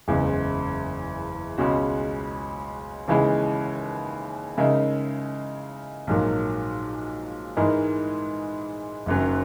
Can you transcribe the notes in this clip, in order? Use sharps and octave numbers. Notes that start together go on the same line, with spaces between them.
F#1 E2 C#3 E3 G#3
C#2 B2 G#3 C#4 F#4
D#2 C#3 E3 G#3
C#3 G#3 D#4 A#4 E5
A#1 G#2 F#3 A#3
G#2 E3 G#3 D#4 A#4
F#1 F#2 D#3 F#3 C#4